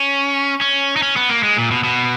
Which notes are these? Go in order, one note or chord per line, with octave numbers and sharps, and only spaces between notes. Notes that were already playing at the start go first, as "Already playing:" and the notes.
Already playing: C#4
C#4
D#4
C#4
B3
A#3
G#3
A#2
B2
B2